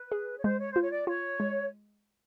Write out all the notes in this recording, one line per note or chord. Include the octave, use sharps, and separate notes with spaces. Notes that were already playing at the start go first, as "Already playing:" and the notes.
Already playing: B4
G#4
C#5
G#3 C5
C#5
C5
F4
C#5
D5
F4 C#5
G#3